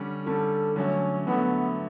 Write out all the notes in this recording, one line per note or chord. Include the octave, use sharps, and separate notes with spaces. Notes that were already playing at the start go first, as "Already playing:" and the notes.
Already playing: D3 G3 C#4
D3 G3 C#4 A4
D3 F#3 A3 C#4
D3 F#3 A3 B3